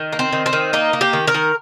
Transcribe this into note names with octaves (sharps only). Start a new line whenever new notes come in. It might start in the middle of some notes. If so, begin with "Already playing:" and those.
Already playing: D#3
A#3
C4
D#3
C4
D#3
A#3 D#4
A#3
G4
D#3
A#4
D#3